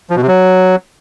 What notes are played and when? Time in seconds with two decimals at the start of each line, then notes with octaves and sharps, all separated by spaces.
0.10 F3
0.16 B2
0.22 C3
0.28 F#3